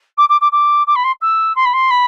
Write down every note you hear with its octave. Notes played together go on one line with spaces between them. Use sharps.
D6
D6
D6
D6
D6
B5
C6
E6
C6
B5
C6
B5